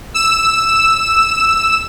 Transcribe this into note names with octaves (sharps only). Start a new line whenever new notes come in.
E6 E7